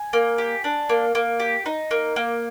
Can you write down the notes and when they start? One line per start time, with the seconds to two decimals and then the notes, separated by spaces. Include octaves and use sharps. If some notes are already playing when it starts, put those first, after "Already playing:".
Already playing: G#5
0.13 A#3
0.38 G4
0.64 D4
0.89 A#3
1.15 A#3
1.40 G4
1.66 D#4
1.91 A#3
2.16 A#3